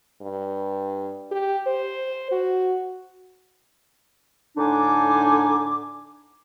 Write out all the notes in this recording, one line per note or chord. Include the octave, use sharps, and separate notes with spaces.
G2
G4
C5
F#4
A2 D3 D4 D#4 G#5 D6